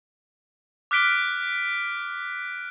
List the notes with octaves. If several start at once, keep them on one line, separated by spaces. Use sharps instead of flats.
D6 F6 F#6 B6 D7 G7